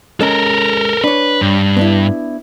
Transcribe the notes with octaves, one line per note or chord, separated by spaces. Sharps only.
G#3 C#4 A4 A#4
D4 B4 C#5
G2
B3 D4 E4